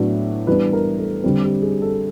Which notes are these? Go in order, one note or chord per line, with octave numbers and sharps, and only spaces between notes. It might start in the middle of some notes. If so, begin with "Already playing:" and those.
Already playing: A2 F#3 B3 D4
E3 G3 B3 D4 B4
A#4
A4
D3 G3 C4
G4
G#4
A4